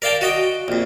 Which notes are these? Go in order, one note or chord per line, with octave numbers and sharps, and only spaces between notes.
A#4 D5 F5 G5 A5
F#4 D#5 G5
A#1 F2